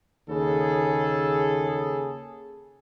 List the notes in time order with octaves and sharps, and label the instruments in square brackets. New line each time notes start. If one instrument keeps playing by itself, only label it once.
[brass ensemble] D#2 C#3 G#4 A4